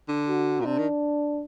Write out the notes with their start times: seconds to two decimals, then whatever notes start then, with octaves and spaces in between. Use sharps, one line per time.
0.08 D3
0.28 F#4
0.60 A#2
0.65 C3 D4
0.78 D#3